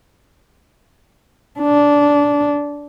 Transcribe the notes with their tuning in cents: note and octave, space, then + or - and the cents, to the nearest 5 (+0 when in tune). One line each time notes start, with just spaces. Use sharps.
D4 -15